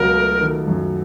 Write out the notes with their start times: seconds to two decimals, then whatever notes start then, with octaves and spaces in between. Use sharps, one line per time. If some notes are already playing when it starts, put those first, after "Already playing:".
Already playing: C#2 B2 F#3 A#4
0.15 A3
0.41 D#3
0.67 F#2